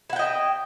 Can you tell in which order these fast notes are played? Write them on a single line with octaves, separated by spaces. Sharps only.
E4 F#5 G5 D#5